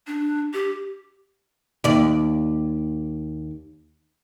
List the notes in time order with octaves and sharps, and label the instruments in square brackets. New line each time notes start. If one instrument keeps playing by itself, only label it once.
[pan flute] D4
G4
[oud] D#2 D5